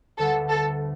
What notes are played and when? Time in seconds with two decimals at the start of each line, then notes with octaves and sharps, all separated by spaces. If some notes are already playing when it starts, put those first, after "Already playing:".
0.18 D2 D3 G3 B3 A4
0.49 A4